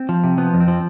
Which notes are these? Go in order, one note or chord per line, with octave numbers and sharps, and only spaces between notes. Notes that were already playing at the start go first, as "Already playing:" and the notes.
Already playing: C4
F3
C3
F3 B3
F2
C4
F3